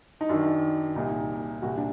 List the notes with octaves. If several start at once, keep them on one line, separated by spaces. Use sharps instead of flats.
D#4
F#2 D#3 D4
C2 A#2 D#4
C2 A#2 F#4
D4